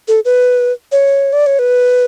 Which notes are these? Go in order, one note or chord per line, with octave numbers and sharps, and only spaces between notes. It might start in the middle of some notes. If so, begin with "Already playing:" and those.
A4
B4
C#5
D5
C#5
B4